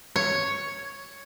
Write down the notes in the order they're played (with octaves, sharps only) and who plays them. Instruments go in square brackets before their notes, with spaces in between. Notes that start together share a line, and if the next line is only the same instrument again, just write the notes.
[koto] C#5